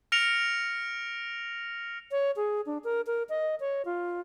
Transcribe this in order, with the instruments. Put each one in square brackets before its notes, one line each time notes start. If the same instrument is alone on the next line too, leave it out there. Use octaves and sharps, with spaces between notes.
[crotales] F6 A#6 C#7 D7 F7
[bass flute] C#5
G#4
D4
A#4
A#4
D#5
C#5
F4